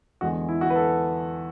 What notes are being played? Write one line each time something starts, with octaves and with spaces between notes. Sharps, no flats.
E2 D3 G#3 F#4
E4
F#4
B4
A4